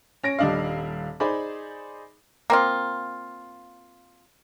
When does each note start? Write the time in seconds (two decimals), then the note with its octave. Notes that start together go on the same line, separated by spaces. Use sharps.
0.23 C#4 A#6 D7
0.39 D#1 G3 D4 D#5 F5
1.20 D#4 G#4 C5 D5 B5
2.50 A#3 C4 F4